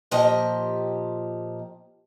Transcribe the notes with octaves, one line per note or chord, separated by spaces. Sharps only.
A#2 F3 G4 D#5